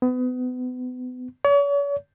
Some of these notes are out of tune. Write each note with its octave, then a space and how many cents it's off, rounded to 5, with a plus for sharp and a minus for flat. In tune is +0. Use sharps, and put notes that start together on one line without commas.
B3 +30
C#5 +40